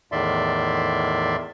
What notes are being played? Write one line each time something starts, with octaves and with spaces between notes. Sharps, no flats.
E2 A2 D#3 D5 E5 C6